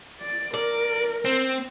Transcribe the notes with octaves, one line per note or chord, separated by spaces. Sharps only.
D5
A#4 D5
C4